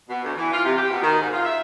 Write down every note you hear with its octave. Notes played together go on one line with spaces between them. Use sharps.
B2
D2
E3
F4
C3
G4
B2
D#3
G#2
F4
E5